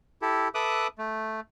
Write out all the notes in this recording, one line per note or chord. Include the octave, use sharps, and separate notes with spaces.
E4 G4 A4
A4 B4 E5 D6 D#6 F#6
A3